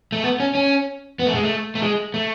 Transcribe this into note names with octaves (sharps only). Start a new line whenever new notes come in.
A3
B3
C#4
C#4
B3
A3
G#3
A3
A3
G#3
A3